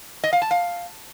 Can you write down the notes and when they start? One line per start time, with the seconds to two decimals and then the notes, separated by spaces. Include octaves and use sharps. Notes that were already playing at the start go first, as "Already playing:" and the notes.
0.24 D#5
0.33 F5
0.42 A5
0.51 F5